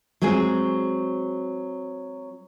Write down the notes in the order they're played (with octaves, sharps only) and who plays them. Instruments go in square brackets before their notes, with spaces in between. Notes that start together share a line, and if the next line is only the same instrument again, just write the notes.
[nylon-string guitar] F#3 G#3 C4 G#4